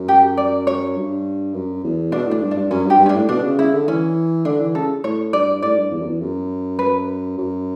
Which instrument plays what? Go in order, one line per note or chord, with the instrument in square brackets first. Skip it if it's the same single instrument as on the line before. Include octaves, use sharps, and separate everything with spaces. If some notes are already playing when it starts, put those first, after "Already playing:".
Already playing: [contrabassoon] F#2
[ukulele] G4
D5
C#5
[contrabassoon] G2
F#2
E2
[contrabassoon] B2 [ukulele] D4
[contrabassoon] A2 [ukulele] D4
[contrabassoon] G2
[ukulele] D4
[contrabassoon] G2
[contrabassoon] F#2 [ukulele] C#4
[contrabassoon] G2 [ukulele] G4
[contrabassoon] G2
[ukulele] C#4
D4
[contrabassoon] A2
[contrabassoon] B2 [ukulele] D4
[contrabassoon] C#3
[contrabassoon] C#3 [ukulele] E4
[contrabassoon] D3
[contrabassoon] E3 [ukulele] C#4
[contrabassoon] D3 [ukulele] D4
[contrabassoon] E3
[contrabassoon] C#3 [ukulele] A4
[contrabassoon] A2 [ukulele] C#5
[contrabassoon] G2 [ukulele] D5
[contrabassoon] A2 [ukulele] D5
[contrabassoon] G2
E2
F#2
E2
F#2
[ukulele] B4
[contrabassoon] F#2